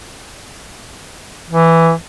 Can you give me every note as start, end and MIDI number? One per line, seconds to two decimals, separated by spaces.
1.50 1.91 52